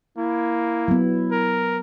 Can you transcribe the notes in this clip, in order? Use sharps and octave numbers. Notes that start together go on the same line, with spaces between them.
A#3 E4
F#3 B3
A#4